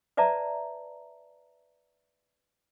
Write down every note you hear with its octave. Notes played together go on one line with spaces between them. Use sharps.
B4 D5 E5 A5 A#5